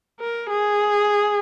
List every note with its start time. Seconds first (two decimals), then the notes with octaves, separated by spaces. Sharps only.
0.20 A#4
0.50 G#4